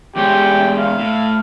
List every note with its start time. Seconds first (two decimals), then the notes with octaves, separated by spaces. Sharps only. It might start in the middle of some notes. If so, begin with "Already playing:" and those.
0.16 E2 G#3 G4 C#5
0.79 F5
0.99 A2